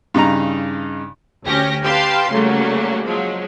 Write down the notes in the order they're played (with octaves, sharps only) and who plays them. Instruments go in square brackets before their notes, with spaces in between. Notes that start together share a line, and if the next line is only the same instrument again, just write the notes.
[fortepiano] G2 C#3 D#4 A#5
[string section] D2 C#4 G4 A#6
G4 B4 F5 G5 A5 C6
C#3 F#3 G3 A3 A#3
F3 F#3 G#3